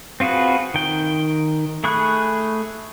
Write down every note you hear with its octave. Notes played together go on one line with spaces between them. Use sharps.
C4 F4 F#4 G#4 B4
D#3 G5
A3 G#4 B5 C#6 F#6